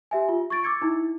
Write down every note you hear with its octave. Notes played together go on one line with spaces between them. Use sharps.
G4 E5 G#5
F4
C#6 G#6 A6 D7
D6 E6 G#6 C#7
D#4 E4